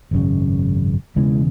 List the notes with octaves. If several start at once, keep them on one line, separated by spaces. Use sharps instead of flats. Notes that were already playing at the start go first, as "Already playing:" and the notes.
G#1 F#2 C#3
E1 E2 C#3 E3 G#3